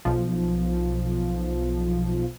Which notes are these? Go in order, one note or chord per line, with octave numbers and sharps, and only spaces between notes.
B1 F3